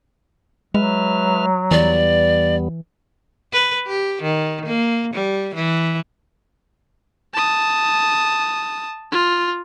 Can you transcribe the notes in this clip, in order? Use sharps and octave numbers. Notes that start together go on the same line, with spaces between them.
F#3 G#3 B4 E5 F6
E2 E3 G3 B3 D5
B4
G4
D#3
A#3
G3
E3
A5 D#6
F4